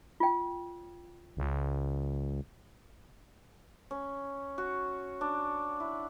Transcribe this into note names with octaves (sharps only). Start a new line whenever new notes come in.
F4 G5
C#2
C#4
F#4
D4
E4